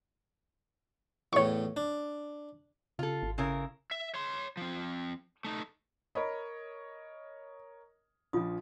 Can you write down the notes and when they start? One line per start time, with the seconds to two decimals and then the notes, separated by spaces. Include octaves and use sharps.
1.33 E2 A2 C#5 C#6
1.77 D4
2.99 C#3 F4 A4
3.23 G#1
3.38 C#3 E4 A#4
3.91 E5
4.14 C#5 C6
4.57 F3 C4
5.45 A3 D#4
6.15 A#4 C#5 D#5 B5
8.33 A#1 F3 F4 D#6